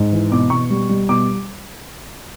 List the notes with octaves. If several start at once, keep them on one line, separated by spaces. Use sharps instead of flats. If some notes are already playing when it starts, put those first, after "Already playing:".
Already playing: G#2
E3
B2 D6
B2 C#6
G3
G3
B2 D6